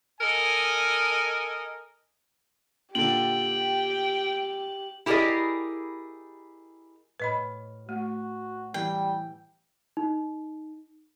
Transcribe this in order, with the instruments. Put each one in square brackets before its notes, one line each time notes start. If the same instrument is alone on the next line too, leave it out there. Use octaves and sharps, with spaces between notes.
[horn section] A4 A#4 D#5 G#5
[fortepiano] A#2 D3 [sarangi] G4 [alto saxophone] G5 [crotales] F#7
[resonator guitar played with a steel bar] E4 G4 G#4 A#4 D5 D#5
[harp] A2 F6 [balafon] B4 D#5 B5
[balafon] A3 [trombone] F#4
[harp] E3 [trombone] G3 [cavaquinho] G5
[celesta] D#4